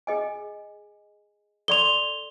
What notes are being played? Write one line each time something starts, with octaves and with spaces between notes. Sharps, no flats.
G#4 D#5 G#5
A4 D5 C6 F7 G7